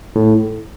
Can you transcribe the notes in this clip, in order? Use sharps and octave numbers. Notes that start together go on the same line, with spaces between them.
A2